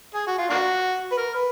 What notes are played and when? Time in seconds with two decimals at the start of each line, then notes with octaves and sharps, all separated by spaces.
0.15 G#4
0.27 F#4
0.39 F4
0.50 A#3 D4 F#4
1.12 B4
1.18 A#4
1.35 B4